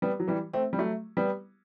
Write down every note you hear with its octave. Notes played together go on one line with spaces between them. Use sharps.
G3 B3
F#3
E3 G3
A3 C4
G3
F#3 A3
G3 B3